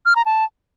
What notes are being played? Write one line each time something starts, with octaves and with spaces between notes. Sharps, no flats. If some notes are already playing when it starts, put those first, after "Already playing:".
F6
A#5
A5